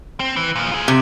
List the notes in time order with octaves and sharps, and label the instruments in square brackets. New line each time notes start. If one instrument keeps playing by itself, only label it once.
[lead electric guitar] C4
E3
A#2 F3
F4 G#4
[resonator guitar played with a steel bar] C3